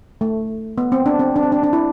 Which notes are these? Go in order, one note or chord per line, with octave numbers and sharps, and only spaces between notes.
A3
B3
C4
D4
C4
D4
C4
D4
D4
E4